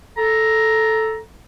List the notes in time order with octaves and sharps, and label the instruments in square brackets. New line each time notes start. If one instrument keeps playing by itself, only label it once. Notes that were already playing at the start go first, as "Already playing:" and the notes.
[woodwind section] A4 A#5